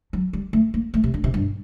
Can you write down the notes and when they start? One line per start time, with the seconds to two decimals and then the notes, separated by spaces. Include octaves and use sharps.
0.13 F#3
0.33 G3
0.53 A3
0.74 A#3
0.94 A3
1.04 C3
1.14 D3
1.24 C3
1.34 G2